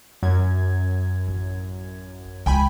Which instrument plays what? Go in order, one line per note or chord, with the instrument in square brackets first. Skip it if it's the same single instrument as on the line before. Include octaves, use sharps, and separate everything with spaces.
[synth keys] F#2 G#6
[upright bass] A1
[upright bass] C#2 [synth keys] G5 G#5 B5